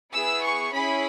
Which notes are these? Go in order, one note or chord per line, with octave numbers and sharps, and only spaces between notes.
B3 E4 G#4 E6
C#6
C#4 E4 G#4 B5